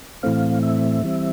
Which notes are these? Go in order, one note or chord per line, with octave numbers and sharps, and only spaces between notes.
A2 E3 A3 C4 F5
E5
E3 G3 C4